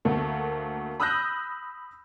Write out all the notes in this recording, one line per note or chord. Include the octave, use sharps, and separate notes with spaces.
D2 A3 A#3
B5 D#6 E6 F#6 G6 A#6